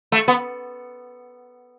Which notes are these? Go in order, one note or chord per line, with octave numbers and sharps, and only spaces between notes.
A3
B3